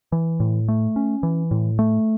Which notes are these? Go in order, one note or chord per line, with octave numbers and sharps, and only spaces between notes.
E3
A2
A3
C#4
E3
A2
A3